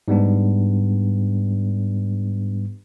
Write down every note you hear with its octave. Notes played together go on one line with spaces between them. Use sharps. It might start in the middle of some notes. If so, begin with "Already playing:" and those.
G#2 G3 B3 D4